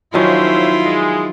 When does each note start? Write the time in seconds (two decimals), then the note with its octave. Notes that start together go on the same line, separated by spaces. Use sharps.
0.14 D#3 F3 F#3 C#4 E4 F4 C5 E5
0.85 G#3